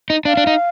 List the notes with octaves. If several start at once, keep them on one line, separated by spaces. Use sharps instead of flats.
D#4
D4 F5
D4
D#4